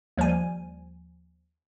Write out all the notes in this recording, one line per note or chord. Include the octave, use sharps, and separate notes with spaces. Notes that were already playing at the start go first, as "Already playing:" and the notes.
D#2 F3 G3 G#5